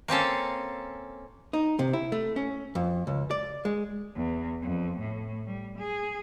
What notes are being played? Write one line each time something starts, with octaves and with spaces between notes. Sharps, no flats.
A#3 C4 C#4 A4
D#4
C3
E4
A3
C#4
F2
C#2
D5
G#3
E2
F2
A2
G3
G#4